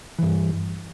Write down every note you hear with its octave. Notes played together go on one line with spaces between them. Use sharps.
G2 E3